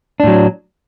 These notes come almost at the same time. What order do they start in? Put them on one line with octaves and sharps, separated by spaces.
D4 A2 F#3